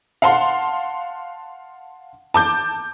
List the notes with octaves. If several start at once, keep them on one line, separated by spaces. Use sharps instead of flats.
F5 F#5 A5 C6
A5 D6 G6